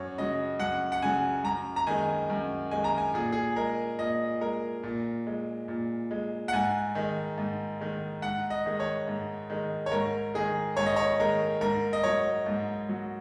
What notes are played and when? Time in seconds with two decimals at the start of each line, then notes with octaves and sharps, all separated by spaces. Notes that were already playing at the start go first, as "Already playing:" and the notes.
Already playing: F#2 C#5
0.18 C#3 F#3 D#5
0.60 F#2 F#5
0.92 F#5
1.02 C#3 F#3 G#5
1.44 F#2 A#5
1.76 A#5
1.87 D#3 G#3 G#5
2.30 F#2
2.71 D#3 G#3 G#5
2.84 A#5
2.98 G#5
3.14 A#2 G#4
3.32 G#4
3.56 G#3 A#4
3.98 A#2 D#5
4.41 G#3 A#4
4.83 A#2
5.27 G#3
5.68 A#2
6.11 G#3
6.48 F#5
6.53 G#2 G#5
6.95 D#3 G#3
7.38 G#2
7.81 D#3 G#3
8.22 G#2 F#5
8.50 D#5
8.66 D#3 G#3
8.80 C#5
9.08 G#2
9.50 D#3 G#3
9.86 C#5
9.92 G#2 A#4
10.34 D#3 G#3 G#4
10.77 G#2 C#5
10.86 D#5
10.96 C#5
11.19 D#3 G#3 A#4
11.61 G#2 A#4
11.93 D#5
12.03 F#3 C#5
12.46 G#2
12.89 F#3